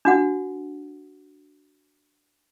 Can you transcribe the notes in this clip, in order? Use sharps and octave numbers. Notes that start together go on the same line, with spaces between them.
D4 F#4 F#5